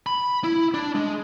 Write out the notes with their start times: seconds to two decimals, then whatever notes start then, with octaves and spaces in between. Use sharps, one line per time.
0.06 B5
0.44 E4
0.74 D4
0.95 G#3